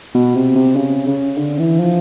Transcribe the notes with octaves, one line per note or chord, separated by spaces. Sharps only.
B2
C3
C3
C#3
C#3
D3
E3
F3